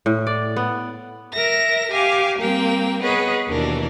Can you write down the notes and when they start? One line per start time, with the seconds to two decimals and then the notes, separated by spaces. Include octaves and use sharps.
0.06 A2
0.27 D5
0.56 B3
1.34 A#4 E5 A#6
1.90 G4 F5 G#5 D6
2.38 G3 A#3 C4 G5
3.02 B3 G#4 B4 C#5 D#5
3.48 D#2 B2 E3 D4 A#4